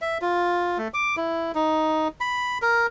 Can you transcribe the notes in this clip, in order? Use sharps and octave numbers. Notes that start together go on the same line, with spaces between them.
E5
F4
A3
D6
E4
D#4
B5
A#4